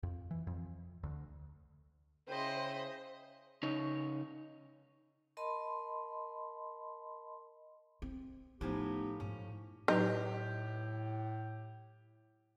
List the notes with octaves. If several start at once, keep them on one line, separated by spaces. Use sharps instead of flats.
F2
E3
F2
D2
C#3 E4 C5 D#5 G5
C#3 D#4 C#5
A#4 D#5 A5 B5 C6
C4
A2 F3 A3 B3 D4 D#4 G4 G#5
G#2 C#4
A2 F#3 D#4 G4 B4 D#5